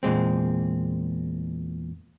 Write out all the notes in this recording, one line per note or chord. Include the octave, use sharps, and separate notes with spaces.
E2 A#2 G#3 C4